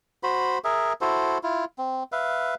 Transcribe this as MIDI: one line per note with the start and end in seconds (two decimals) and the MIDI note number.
0.23 0.58 66
0.23 0.58 72
0.23 0.58 83
0.64 0.93 68
0.64 0.93 70
0.64 0.93 76
1.01 1.38 64
1.01 1.38 66
1.01 1.38 69
1.01 1.38 72
1.43 1.65 64
1.43 1.65 65
1.78 2.03 60
2.12 2.55 71
2.12 2.55 76
2.12 2.55 77